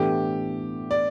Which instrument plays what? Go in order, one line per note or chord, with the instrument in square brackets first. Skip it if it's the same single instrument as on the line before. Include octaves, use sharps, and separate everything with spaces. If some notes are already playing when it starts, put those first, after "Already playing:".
Already playing: [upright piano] A2 E3 B3 D4 A4 [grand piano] G4
[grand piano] D5